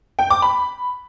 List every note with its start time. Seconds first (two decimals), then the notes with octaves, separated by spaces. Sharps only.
0.19 G5
0.30 D6
0.42 B5